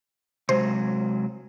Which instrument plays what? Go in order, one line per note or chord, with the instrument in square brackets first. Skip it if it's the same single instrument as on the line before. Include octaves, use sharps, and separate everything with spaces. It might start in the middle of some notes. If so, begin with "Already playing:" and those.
[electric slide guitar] C3 F#3 G#3 [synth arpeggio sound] C5